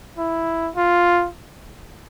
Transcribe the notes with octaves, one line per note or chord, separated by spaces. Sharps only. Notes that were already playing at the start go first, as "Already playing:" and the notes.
E4
F4